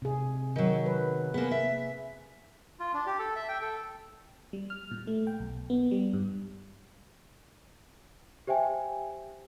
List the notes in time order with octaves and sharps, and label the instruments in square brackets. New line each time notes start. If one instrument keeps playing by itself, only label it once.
[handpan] C3 G#4
[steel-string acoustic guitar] D#3 F#3
[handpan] B4
[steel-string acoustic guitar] A#3 B3 [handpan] G#4
[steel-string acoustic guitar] E5
[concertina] F4
D4
G4
A4
E5
G5
A4
[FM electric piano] G3
F6
A#2
A3
G5
B1
B3
G3
G2
[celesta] G4 C5 E5 G5 G#5